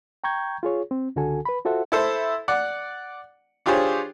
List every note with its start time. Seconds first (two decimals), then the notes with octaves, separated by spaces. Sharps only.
0.24 G5 A#5 C#6 G6 G#6
0.63 F4 G#4 C#5
0.91 C4
1.16 C#2 D3 F#4 A4 G#5
1.45 B4 B5
1.65 F4 F#4 A4 C5 E5 F#5
1.92 E4 A4 C5
2.48 D5 F#5
3.66 D4 F4 G4 G#4 C5 C#5